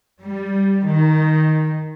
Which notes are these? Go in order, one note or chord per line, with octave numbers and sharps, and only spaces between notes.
G3
D#3